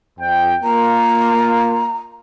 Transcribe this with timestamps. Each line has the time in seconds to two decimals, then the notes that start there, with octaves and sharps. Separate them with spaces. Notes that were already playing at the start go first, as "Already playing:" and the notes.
0.20 F2 G5
0.64 A#3 F4 A#5